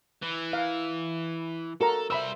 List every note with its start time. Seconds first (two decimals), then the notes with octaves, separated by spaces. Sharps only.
0.22 E3
0.53 F5
1.81 F#4 A4 A#4 A#5
2.10 G3 C5 E5 B5 E6